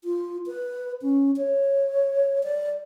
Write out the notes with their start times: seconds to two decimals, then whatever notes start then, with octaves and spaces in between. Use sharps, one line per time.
0.04 F4
0.47 B4
1.02 C#4
1.37 C#5
2.44 D5